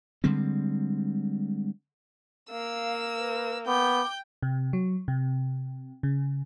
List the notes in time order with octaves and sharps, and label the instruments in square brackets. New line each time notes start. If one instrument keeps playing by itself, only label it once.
[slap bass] D3 G3 G#3 C4
[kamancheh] A#3 [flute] F5 [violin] E6
[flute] B4
[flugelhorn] B3 [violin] G5 G6 [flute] D6
[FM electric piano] C3
F#3
C3
C#3